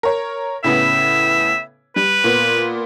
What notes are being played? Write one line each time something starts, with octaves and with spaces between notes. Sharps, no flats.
A#4 C#5
A2 C#3 B3 E5
G3 B4
A#2 B3